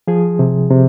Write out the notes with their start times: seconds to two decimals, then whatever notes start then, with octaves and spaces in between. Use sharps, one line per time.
0.07 F3 G#4
0.39 C3
0.70 C3